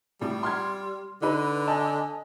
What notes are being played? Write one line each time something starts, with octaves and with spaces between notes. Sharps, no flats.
A2 G3
C6 F6 G#6
D3 D#4 B4
D#5 G#5 A5